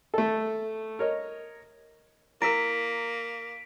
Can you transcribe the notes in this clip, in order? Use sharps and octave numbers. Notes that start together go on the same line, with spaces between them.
A3 A4
A#4 C#5 D#5
A#3 E4 A#4 B6 D7